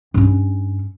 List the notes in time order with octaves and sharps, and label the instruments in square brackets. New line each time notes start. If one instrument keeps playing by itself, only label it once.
[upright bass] G2 C#4